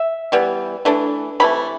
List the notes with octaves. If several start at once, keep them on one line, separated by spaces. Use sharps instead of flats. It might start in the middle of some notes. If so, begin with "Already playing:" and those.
Already playing: E5
E3 G3 B3
E3 A3 D4
C3 E3 A3 B5